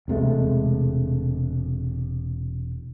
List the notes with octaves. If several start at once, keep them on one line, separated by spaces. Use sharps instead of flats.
E1 C3 G#3 A3